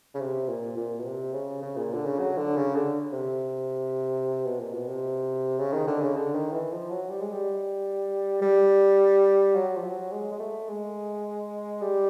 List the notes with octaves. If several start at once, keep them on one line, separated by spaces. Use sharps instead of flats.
C#3
C3
A#2
A#2
B2
C3
C#3
C#3
A#2
D3
C#3
F#3
D3
C#3
D3
C3
B2
A#2
B2
C3
C#3
D#3
D3
C#3
D3
D#3
E3
F3
F#3
G3
G#3
G3
G3
F#3
F3
F#3
G#3
G#3
A3
G#3
G3